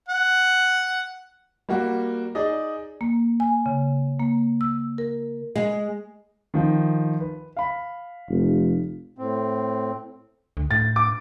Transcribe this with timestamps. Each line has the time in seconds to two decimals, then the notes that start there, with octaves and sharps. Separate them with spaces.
0.08 F#5
1.69 G3 A#3 F#4
2.35 D#4 G#4 D5 D#5
3.01 A#3
3.40 G#5
3.66 C#3
4.20 A#3
4.61 E6
4.98 A#4
5.55 G#3
6.54 D#3 F3 D#4
7.20 B4
7.57 F5 B5
8.29 F1
9.18 A2 C4
10.57 D2
10.71 A2 A6
10.96 D6